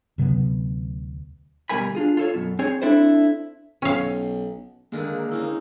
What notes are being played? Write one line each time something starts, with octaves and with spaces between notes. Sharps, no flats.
D2 C3 F#3 B3
D2 B2 G3 A#4 G#5 B5
D4 F4 G#4
F4 A4 C#5
F#2 B2
C4 G#4 C#5 G#5
C4 D4 E4 A4 C5
B1 C#4 F5
D3 D#3 G#3 A#3
C4 C#4 D#4 E4